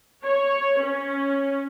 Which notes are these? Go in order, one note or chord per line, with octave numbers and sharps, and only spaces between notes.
C#5
C#4